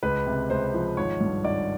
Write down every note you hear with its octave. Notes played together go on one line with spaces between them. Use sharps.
C#2 B4
C3
C#2 C5
F3
G#1 C#5
G2
G#1 D5